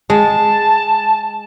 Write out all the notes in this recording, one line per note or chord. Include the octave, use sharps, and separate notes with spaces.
G#3 A5